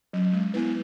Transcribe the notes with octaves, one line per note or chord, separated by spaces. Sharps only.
F#3 C#4
G#3
B3 E4 B4